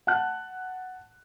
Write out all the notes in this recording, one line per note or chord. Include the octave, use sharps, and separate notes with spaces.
F#5 A5 F#6